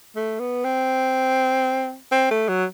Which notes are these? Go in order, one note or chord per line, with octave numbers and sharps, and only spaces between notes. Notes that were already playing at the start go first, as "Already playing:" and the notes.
A3
B3
C4
C4
A3
F#3